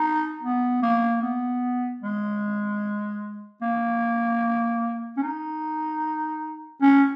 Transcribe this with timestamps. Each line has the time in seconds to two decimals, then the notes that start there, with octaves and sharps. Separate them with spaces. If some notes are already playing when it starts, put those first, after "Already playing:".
Already playing: D#4
0.43 B3
0.83 A#3
1.22 B3
2.02 G#3
3.62 A#3
5.17 C#4
5.23 D#4
6.82 C#4